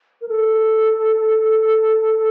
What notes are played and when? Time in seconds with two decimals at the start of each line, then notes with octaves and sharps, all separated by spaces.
0.21 A#4
0.28 A4